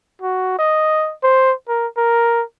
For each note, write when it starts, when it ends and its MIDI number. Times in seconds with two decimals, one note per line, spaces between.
0.22 0.58 66
0.59 1.13 75
1.23 1.53 72
1.69 1.87 70
1.97 2.43 70